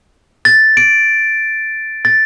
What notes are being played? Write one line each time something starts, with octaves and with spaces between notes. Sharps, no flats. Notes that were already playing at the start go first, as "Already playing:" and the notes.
A6
D7
A6